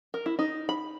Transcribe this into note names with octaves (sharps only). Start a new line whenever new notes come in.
A#4
E4
D#4
B5